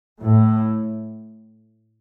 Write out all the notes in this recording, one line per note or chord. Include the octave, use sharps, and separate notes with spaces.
A2